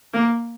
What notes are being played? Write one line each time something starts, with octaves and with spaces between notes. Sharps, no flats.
A#3